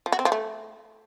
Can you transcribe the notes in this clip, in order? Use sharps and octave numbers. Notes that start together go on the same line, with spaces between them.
F3
F#4
C4
F3
A3